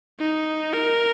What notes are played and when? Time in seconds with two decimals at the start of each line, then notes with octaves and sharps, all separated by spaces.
0.19 D#4
0.74 A#4